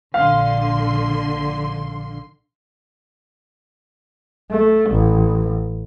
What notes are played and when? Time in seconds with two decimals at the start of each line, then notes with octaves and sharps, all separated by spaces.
0.14 A#1 D3 F5 C6
4.50 A3
4.90 A1